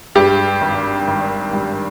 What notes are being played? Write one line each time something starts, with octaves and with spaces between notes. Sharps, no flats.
G2 G4
G#1
G#1
G3